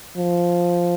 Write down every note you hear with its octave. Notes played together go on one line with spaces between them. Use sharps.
F3